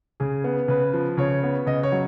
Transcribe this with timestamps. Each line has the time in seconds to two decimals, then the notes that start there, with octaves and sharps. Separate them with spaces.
0.20 C#3 G#4
0.44 B3
0.68 C#3 B4
0.93 F3
1.17 C#3 C#5
1.43 B3
1.66 C#3 D#5
1.83 C#5
1.92 F#3